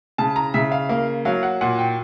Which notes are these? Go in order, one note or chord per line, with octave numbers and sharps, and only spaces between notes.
C#3 A5
A#5
C#3 E5
F5
A#3 F5
F#3 F5
F#5
A#2 F#5
G5